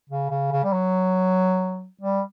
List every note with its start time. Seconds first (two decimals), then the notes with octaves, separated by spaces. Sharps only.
0.10 C#3
0.31 C#3
0.52 C#3
0.64 G3
0.73 F#3
2.02 G3